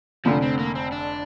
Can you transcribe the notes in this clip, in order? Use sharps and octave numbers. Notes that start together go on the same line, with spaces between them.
F1 F2 D3 F3
C4
A#3
C4
D4